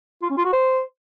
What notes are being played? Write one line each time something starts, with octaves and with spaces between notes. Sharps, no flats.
F4
C#4
F4
F#4
C5